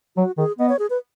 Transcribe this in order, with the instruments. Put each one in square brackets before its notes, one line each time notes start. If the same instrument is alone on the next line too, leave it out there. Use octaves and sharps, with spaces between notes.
[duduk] F#3 [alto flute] F#4
[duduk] D#3 [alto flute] G#4
[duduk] B3 [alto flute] D#5
[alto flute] C#5
G#4
B4